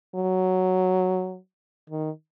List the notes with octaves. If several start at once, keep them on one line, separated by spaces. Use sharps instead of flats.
F#3
D#3